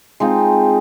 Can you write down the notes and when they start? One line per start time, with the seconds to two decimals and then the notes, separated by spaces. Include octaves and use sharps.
0.20 G#3 C4 D#4 F4